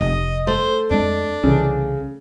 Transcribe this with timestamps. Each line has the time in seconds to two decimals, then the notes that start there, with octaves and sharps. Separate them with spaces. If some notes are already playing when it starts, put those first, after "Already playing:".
0.01 F1 D#5
0.47 A3 C5
0.91 F2 G#3 D4
1.43 C2 C#3 E3